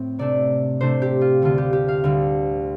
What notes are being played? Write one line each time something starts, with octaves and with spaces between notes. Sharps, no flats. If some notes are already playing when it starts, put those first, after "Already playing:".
Already playing: A2 C4
C3 A3 D4 D5
C3 A3 D4 C5
G4
F4
D2 D3 G3 F4
G4
G4
F5
D2 D3 G3